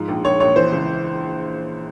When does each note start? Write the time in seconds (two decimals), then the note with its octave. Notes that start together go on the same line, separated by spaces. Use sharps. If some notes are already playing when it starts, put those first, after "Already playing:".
Already playing: G#2 F3
0.08 A#1
0.24 A#1 C#5
0.40 A#1 C#5
0.55 E3 C5
0.72 C#2